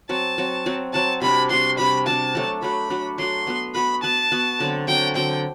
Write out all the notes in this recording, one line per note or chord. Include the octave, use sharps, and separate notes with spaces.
F#3 C4 F#4 A5
F#3 C4 F#4
F#3 C4 F#4
F#3 C4 F#4 A5
C3 G3 D4 F#4 B5
C3 G3 D4 F#4 C6
C3 G3 D4 F#4 B5
C3 G3 D4 F#4 A5
F#3 A3 D4 F#4
F#3 A3 D4 F#4 B5
F#3 A3 D4 F#4
F#3 A3 D4 F#4 C6
B3 F#4 B4
B3 F#4 B4 B5
B3 F#4 B4 A5
B3 F#4 B4
D3 F#3 C4
D3 F#3 C4 G5
D3 F#3 C4 G5